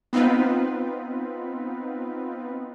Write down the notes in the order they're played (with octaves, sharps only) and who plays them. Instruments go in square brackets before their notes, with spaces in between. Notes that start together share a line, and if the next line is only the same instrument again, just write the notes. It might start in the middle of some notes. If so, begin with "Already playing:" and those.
[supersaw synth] B3 C4 D#4 F4 B4